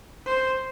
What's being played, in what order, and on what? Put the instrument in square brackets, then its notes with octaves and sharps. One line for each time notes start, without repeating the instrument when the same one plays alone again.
[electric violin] C5